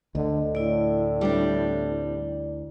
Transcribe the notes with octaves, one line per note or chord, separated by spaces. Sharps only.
D2 D3 D#5
A2 E4 D5
G3 C4 D4